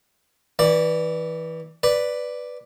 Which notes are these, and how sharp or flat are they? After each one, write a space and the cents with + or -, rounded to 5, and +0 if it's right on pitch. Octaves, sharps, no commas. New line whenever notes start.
E3 -20 D5 +0
B4 +0 D5 +0